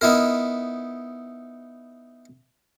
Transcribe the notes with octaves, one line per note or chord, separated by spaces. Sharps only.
B3 D#4 E4 A#4